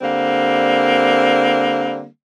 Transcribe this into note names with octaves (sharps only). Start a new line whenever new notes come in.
D3 G3 A#3 C4